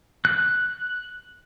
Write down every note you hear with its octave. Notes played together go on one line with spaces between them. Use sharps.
F#6